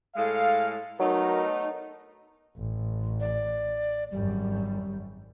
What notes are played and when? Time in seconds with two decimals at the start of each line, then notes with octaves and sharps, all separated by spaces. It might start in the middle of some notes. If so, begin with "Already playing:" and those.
0.16 A2 G#3 A4 F5
1.00 F#3 A3 B3 D#4 A#4
2.57 A1
3.20 D5
4.11 G#1 F#2 G3